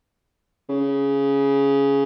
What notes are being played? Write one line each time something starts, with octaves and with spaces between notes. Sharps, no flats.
C#3